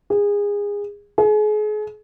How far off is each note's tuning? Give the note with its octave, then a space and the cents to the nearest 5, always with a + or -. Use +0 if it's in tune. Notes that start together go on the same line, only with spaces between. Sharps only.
G#4 -25
G#4 +35